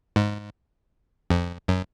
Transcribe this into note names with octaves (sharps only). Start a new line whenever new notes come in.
G#2
F2
F#2